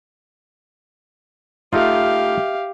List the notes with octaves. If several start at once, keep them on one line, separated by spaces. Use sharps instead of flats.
A3 D#4 F4 G4 E5 F5 F6